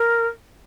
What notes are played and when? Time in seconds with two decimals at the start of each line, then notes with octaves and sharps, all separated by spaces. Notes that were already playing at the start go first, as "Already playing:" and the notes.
Already playing: A#4